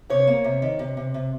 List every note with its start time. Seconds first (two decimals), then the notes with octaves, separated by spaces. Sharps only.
0.10 C3 C#5
0.27 A#3
0.44 C3
0.62 D#3
0.79 C3
0.97 C3
1.14 C3